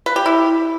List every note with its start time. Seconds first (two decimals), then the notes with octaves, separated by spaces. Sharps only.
0.06 B4
0.16 G4
0.26 E4